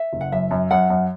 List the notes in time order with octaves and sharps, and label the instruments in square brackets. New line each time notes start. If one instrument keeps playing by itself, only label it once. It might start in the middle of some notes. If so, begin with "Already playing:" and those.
Already playing: [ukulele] E5
[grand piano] F#1
[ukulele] F#5
[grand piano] F#2 [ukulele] E5
[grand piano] F#2
[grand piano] F#2 [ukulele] F#5
[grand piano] F#2